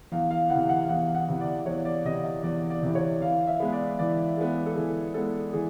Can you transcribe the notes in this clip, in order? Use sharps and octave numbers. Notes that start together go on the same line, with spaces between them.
E2 F5
F5
C3 E3 F#5
F#5
F5
E2 F#5
F#5
C3 E3
D5
E2 C#5
D5
C3 E3 D#5
D#5
E2 D5
D5
C3 E3
C#5
E3 F5
E5
G#3 B3
D5
E3 D5
G#3 B3
A4
E3 G#4
G#3 B3 A4
E3 G#4